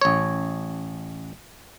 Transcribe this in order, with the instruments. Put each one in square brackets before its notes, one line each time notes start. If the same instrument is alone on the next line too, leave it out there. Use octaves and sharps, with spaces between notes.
[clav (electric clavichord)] A1 C#5